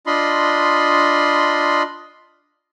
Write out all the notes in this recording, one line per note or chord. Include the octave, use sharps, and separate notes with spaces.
D4 F4 D#5 B5 C6